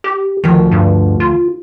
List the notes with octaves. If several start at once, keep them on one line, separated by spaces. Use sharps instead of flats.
G4
D2 D#3 F3
G2
F4